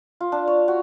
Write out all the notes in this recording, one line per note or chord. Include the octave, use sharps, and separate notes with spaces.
F4
D4
C#5
F#4